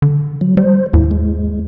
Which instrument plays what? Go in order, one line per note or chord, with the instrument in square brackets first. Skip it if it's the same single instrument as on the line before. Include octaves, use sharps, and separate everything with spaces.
[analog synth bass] D3
[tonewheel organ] F#3
[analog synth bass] G3 [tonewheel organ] C5
[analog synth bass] D#2 [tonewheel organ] G#2 E4
[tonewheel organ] G#3